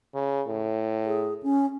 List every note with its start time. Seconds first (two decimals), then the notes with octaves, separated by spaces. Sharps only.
0.14 C#3
0.47 A2
1.06 G#4
1.43 C#4